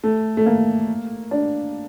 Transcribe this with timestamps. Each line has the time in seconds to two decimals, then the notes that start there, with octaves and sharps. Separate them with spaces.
0.04 A3
0.37 A3
0.46 A#3
1.31 D4